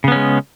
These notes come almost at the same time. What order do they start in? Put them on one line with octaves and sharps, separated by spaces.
C#3 B3 C#4 G#3